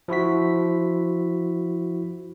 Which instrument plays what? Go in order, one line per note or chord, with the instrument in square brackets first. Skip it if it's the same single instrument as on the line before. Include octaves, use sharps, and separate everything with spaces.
[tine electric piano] F3 E4 F#4 B6